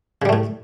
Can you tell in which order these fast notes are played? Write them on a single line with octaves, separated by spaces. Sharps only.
C#3 G3 A3 A2